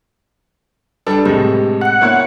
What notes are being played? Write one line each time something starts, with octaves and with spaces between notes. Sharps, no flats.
G3 D4 A4 B4 A5
A2 C3 G#3 G4
F#5 F#6 C#7
A#3 B3 E4 C#5